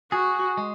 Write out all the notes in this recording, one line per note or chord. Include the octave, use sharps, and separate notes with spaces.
F#4 G#4
G#3